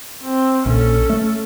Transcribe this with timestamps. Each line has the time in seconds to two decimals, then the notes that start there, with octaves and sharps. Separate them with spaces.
0.22 C4
0.66 A#1 C#4 A4
1.10 A3